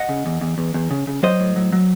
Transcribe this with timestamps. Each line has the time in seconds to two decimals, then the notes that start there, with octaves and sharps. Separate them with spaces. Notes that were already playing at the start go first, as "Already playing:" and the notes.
Already playing: D#5 F#5
0.09 C#3
0.26 E2
0.41 E2
0.58 E2
0.74 E2
0.91 C#3
1.07 C#3
1.23 F#3 C5 D#5
1.40 A2
1.56 F#3
1.72 F#3